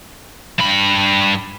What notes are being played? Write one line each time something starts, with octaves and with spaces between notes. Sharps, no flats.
G2 B5